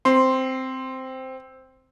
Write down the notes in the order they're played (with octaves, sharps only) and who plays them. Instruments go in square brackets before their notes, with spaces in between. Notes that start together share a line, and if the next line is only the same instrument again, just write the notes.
[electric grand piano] C4 C6